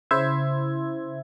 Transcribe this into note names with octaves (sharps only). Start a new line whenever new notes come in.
C#3 E4 C5 E5 G#6